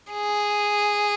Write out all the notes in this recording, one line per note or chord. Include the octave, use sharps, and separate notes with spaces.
G#4